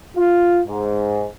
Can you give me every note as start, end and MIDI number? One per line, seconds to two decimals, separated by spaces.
0.16 0.60 65
0.68 1.27 44